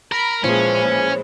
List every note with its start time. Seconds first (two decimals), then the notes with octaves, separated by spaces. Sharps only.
0.12 A#4 A#5 B5
0.44 A#2 E3 F3 G#3 C#4